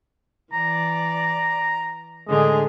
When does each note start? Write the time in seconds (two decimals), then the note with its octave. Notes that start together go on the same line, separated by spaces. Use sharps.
0.53 E3 D5 A#5
2.28 A2 D3 G#3 G#4 D#5